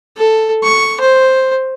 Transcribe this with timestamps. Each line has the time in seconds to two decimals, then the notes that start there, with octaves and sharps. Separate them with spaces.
0.17 A4
0.63 C#6
1.00 C5